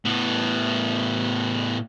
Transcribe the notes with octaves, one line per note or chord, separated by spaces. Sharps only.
A2 B3